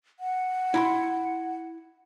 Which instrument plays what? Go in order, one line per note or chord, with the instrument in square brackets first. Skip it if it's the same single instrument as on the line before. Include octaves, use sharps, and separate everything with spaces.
[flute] F#5
[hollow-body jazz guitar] E4 A#5 C6